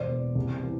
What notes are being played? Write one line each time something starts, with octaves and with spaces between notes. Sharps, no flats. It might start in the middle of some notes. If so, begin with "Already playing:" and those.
Already playing: E1 C5 D5
E2
C2
E3